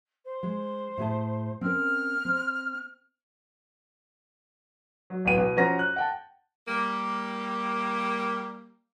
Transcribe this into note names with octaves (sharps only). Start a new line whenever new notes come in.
C5
G#3
A2 G#4 A5
C4 C#4 A#4 F6
C4
F#3
A1 F#3 B3 G5 D#7
B2
F3 C#4 F#4 C5 A#5 A#6
F#6
F#5 G5 A5
G3 A#3